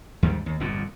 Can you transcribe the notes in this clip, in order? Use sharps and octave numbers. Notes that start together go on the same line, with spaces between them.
D#2 G#2 D3 G3
D#2
G1 F2 A#2